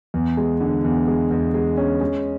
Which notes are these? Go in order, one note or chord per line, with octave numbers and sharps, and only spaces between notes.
E2
G#3
D3
E2
G#3
E2
G#3
C#4
G#3